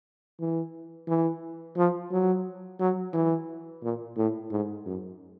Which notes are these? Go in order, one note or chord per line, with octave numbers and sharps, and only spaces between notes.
E3
E3
F3
F#3
F#3
E3
A#2
A2
G#2
F#2